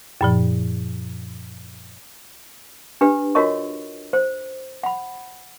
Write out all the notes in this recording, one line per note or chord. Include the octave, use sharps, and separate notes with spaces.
F#2 A#2 F3
D4 G4 B4
F4 F#4 A#4 C#5 D#5 C#6
C5
F#5 B5